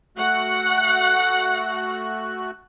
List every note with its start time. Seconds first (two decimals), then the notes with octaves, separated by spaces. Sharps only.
0.17 A3 F#4 F#5 F#6